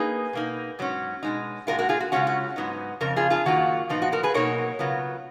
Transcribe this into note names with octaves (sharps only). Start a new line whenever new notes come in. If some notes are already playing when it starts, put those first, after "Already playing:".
Already playing: A#3 D#4 G#4 B4
B2 A#3 D#4
G#2 F#3 C#4
B2 G#3 D#4
A#2 G#3 C#4 F4 F#4 A#4
F#4 A#4
F4 G#4
F#4
C#3 G#3 C#4 F4 F#4
F#4
G#2 F#3 B3 D#4
F2 C#3 A#4
F4 G#4
F4 G#4
F#2 D#3 A#3 F4 F#4
A#2 F3 B3 D#4 F4
F#4
F#4 A#4
G#4 B4
B2 F#3 A#3 D#4 A#4 C#5
C#3 F#3 B3 F4